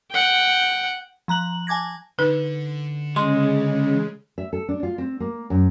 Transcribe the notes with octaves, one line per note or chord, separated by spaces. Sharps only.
F#5 G5
F3 A#5 F#6 F#7
G#5 A5 D6 G#6 A#6
D3 D#4 B4
C#3 G#3 C6
E5
A4
D4
F4
C4
A#3
F#2